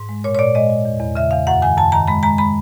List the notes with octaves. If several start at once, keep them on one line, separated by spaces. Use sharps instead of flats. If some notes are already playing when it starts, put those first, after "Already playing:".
Already playing: G#2
G#3
A#2 C#5
C#5
A#2 D5
G#3 D#5
A#2
E2
E2
C#3 E5
E2 F5
F#2 F#5
D#3 G#5
F#2 A5
D#3 A#5
G#3 B5
G#3 A#5
G#3 B5